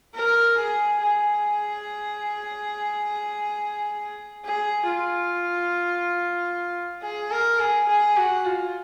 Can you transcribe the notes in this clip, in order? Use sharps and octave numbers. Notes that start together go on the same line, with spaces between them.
A#4
G#4
G#4
G#4
F4
G#4
A#4
G#4
G#4
F#4
F4